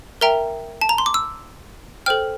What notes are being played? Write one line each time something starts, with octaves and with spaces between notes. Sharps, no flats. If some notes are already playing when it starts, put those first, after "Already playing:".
A#4 E5 G5 A#5
A5
A#5
C6
D6
E6
A4 C5 G5 F6